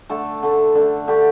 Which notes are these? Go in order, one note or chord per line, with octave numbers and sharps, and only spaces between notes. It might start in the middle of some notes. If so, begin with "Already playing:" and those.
D3 A3 A4
D3 A3
D3 A3
D3 A3 G4